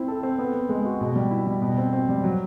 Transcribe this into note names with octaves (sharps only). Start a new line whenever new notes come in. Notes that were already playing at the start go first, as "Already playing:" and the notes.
Already playing: C4 E4
A4
C4
B3
B3
G#3
F#4
B2
G3
E4
G3
B2
C4
C4
G3
F#3